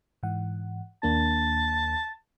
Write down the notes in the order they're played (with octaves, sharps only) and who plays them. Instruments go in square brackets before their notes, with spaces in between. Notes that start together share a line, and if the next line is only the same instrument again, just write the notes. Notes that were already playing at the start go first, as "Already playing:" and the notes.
[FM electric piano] G#2 E3 F#5
[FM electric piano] D#2 A#3 D4 [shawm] A5